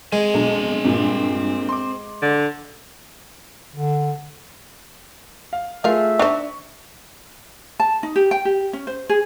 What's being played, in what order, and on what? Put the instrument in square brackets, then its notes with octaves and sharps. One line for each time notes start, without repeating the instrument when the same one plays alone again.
[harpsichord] G#3 [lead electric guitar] C4 G#5
[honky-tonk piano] B1 D4
G2 A#2
C6 D6
[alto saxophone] D3
[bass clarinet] D3
[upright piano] F5
[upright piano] A3 F4 G#4 [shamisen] A#4 F5 [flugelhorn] E5
[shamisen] D4 D#4 C5 [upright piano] C#6
[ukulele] A5
D#4
G4
G5
G4
C#4
C5
G#4